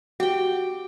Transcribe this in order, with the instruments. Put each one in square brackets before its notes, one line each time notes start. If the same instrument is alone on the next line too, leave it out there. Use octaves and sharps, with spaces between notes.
[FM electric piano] F#4 [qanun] G4 G5